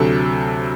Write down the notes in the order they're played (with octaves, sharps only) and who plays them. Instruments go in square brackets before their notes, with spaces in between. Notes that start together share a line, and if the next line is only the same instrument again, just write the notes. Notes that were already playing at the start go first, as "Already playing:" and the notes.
Already playing: [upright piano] D2 C3 F#3 A4